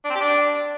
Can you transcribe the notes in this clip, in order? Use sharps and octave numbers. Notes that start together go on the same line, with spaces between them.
D4
C4
G4
D4